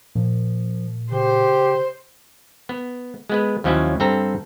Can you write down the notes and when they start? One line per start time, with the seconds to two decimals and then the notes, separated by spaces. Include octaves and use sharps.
0.15 A#2 F3
1.12 C#3 G4 C5
2.69 B3
3.30 G#3 B3 B4
3.64 D#2 F3 F#3 C#4 E4 F#5
4.00 G2 C4 A4 A#5